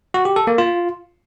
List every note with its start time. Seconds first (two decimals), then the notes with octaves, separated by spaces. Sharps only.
0.14 F#4
0.25 G4
0.36 A4
0.47 A#3
0.58 F4